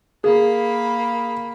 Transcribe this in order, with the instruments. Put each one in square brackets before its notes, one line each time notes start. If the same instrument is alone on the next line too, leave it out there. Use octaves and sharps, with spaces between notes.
[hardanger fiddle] A#3 B5 [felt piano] G#4